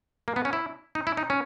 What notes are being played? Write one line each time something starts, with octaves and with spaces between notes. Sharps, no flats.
A#3
B3
C#4
E4
D#4
E4
D#4
C#4